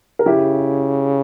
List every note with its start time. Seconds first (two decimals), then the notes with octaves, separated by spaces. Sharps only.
0.19 A#4
0.26 C#3 E4 G4